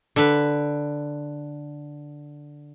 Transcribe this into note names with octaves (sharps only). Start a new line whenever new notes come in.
D3 B4